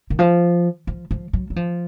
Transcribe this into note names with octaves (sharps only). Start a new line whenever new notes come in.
D#3
F3
F3
F3
F#3
F#3
F3